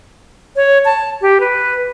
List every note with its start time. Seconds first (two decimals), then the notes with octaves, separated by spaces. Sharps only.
0.56 C#5
0.85 A5
1.22 G4
1.40 B4